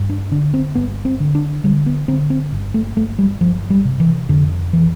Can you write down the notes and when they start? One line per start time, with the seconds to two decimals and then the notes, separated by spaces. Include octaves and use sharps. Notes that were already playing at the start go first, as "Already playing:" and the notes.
Already playing: G2
0.10 D4
0.31 D3 D4
0.54 C4
0.75 G1 B3
1.05 C4
1.20 D3
1.35 D4
1.64 D3 G3
1.86 B3
2.08 D3 C4
2.30 C4
2.52 G1
2.74 A3
2.97 G1 A3
3.19 G3
3.41 G1 F3
3.70 G3
3.85 C3
4.00 E3
4.29 F2 D3
4.73 E3